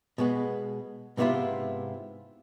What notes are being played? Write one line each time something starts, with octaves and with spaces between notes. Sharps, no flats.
B2 G#3 B3
G#2 C3 B3 C#4 E4 F4